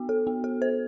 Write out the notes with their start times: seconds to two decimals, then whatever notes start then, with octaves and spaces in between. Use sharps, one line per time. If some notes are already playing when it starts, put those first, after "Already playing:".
Already playing: B3 F#4
0.09 A4
0.27 B3
0.44 A4
0.62 C5